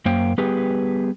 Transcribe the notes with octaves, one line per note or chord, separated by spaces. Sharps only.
F#2 A#3 C5 G5
G3 B3 G4 G#4 B4